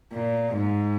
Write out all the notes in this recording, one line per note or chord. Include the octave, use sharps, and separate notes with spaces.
A#2
G#2